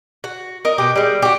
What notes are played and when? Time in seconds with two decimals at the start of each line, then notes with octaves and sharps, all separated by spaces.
0.24 F#4
0.65 A#4 D#5
0.78 B2 G4
0.96 G3 G#3
1.22 F#4 G4